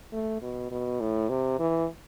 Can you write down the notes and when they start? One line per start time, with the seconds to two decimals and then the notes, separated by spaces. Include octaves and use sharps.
0.12 A3
0.42 B2
0.71 B2
1.00 A2
1.30 C3
1.59 E3